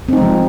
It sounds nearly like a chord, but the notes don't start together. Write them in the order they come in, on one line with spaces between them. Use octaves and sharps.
C4 D#4 G#3 F3